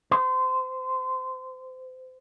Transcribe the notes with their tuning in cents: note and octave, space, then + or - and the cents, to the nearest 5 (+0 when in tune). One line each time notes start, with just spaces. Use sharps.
C5 -25